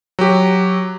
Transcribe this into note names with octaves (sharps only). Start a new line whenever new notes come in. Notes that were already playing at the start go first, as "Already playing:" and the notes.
F#3 G4